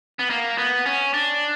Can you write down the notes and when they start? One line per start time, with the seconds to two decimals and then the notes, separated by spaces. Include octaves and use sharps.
0.19 B3
0.30 A#3
0.58 B3
0.86 C#4
1.14 D4